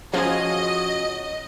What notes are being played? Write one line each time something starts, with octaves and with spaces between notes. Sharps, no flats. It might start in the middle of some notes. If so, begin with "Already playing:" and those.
F3 F#3 C#4 F4 G#4 D#5 G#5